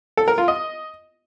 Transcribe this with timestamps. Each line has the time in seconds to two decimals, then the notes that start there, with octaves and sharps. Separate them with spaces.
0.17 A4
0.28 A#4
0.38 F4
0.48 D#5